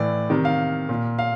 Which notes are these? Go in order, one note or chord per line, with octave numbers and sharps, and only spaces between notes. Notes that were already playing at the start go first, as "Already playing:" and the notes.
Already playing: A2 E3 D5
C3 D#3
F5
A#2
F5